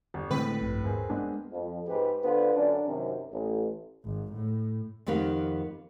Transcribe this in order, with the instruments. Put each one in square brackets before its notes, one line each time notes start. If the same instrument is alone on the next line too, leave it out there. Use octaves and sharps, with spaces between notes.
[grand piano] G1
[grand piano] A2 [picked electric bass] D3 G#3 C4 [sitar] B4
[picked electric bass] A#1 G2
[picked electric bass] D#1 G#2 [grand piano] C4 G#4 A#4
[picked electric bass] G#3 B3 D4
[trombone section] F2
G#2 G4 B4
D3 B3 D4 F4 B4 C5
F#2 D3 C#4 D4
F#2 C3 D#3
A1
[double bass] G#1
A2
[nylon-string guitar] F2 D#3 B3 G4 A#4 F5